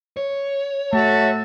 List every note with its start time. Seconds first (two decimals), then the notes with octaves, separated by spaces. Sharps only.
0.17 C#5
0.93 A3 F#4 E5 A5